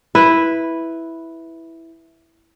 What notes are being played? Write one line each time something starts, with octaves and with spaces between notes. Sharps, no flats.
E4 B4